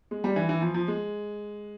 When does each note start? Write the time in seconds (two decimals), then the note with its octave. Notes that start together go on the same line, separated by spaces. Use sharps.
0.11 G#3
0.24 G3
0.36 E3
0.49 E3
0.62 F3
0.74 F3
0.88 G#3